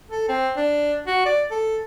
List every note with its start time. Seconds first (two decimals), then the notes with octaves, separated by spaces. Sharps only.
0.11 A4
0.29 C4
0.57 D4
1.07 F#4
1.26 D5
1.51 A4